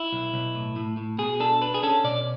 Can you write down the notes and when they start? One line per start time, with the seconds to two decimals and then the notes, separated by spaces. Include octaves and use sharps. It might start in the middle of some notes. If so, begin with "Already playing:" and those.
Already playing: E4
0.12 B1
0.34 B1
0.55 A2
0.76 A2
0.97 A2
1.18 B2 G#4
1.40 D4 A4
1.61 D4 B4
1.74 G#4
1.83 C#4 A4
2.04 B2 D5